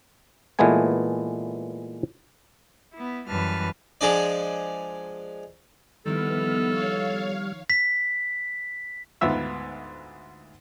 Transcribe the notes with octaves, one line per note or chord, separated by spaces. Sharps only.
A#2 E3 G#3 A3 B3 G#5
B3 E4
F#2 E3 G3 B4 A5 F6
F3 G#3 D4 D5
D#3 F3 G3 B3 E4 A4 F6
C#5 F5
B6
D2 G#2 B3 F4 E5 E6